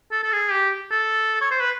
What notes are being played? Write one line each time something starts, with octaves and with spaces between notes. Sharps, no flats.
A4
A4
G#4
G4
A4
C#5
C5
B4